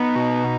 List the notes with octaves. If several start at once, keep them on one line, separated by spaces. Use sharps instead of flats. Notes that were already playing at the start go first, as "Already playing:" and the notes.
Already playing: B3 D#4
B2